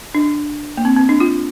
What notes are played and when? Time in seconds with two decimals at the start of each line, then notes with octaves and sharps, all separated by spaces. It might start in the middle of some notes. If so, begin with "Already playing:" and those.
0.15 D4
0.77 A#3
0.85 C4
0.97 C4
1.09 D4
1.20 F4